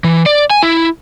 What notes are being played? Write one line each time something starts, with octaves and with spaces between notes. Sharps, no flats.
E3
D5
G#5
E4